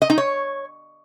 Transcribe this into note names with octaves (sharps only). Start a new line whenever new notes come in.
D#5
D#4
C#5